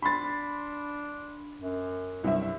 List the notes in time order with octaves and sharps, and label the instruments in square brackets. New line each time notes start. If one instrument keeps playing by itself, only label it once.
[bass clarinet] D4 [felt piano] B5 C6 A6
[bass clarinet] F#2
[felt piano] C2 G2 E5 [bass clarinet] F#3